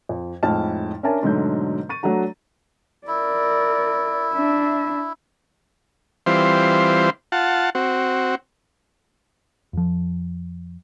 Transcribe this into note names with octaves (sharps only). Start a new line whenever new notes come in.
F2
F2 A2 G#3 D#4 A5 F6
C#4 D4 A#4 E5 G#5 A5
G#2 B2 D3 F#3 A3 G6
C#6 A6 D#7
F#3 A3 D4 F#4 A#5
E4 A#4 D5
D4 E5
E3 G3 C4 F4 C5
F4 F#5 A5
C4 F#4
F2 F3